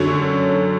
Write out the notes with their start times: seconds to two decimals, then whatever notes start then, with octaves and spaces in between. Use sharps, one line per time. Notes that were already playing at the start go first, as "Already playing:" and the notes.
Already playing: F#2 D3 F#3 C#5